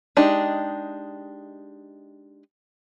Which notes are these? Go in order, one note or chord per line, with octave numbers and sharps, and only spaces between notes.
G#3 D4 D#4 G4